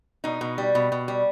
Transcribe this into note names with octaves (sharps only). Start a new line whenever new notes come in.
B2 D#4
B2
G3
B2
B2
G3